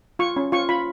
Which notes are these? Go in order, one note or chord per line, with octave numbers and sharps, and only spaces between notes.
F4 C#6
C#4
F4 C#6
F4 B5